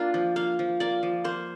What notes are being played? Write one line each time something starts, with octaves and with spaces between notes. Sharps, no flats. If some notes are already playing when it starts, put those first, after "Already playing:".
Already playing: A#3 D4 F4
F3
A#3 F5
F3
A#3 D5
F3
A#3 C5